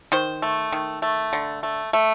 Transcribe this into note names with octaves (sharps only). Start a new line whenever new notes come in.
D#3 C5
A3
D#3
A3
D3
A3
A3